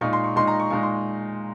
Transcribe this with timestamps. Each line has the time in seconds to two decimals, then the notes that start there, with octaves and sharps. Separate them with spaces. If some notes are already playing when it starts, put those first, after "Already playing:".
0.01 A#2 G#3 D#4 C#6
0.13 C6
0.24 C#6
0.36 A#2 G#3 D#4 C6
0.47 A#5
0.60 C#6
0.70 A#2 G#3 D#4 C#6
0.83 C6